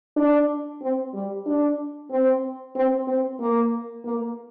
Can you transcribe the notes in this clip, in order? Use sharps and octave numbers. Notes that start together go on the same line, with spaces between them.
D4
C4
G3
D4
C4
C4
C4
A#3
A#3